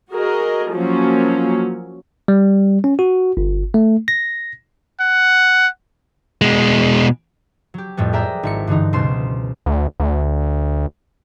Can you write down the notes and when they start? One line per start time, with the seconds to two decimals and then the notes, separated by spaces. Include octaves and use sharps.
0.11 F#4 G#4 A#4 D#5
0.72 F3 F#3 A#3 C#4
2.28 G3
2.84 C#4
2.99 F#4
3.37 G1
3.74 A3
4.08 A#6
5.01 F#5
6.42 B2 G#3
7.74 F#3 G4
7.97 F2 A2 G3 B3
8.13 G#4 A#4 D5 E5 G5 A#5
8.43 G#1 E4 C#7
8.67 G2 D3 E3 D#4
8.93 C#2 B2 F#3 C5 C6 E7
9.66 D2
10.00 D2